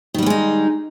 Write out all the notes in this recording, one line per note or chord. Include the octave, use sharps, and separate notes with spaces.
D#3 G3 G#3 B3 D#4